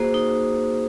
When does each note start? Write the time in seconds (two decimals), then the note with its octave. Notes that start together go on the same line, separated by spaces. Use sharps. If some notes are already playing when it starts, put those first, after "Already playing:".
Already playing: A#3 F#4 G#4 C5
0.14 D#4